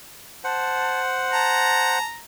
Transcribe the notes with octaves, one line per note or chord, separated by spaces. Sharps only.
C5 F#5 A5
A5 A#5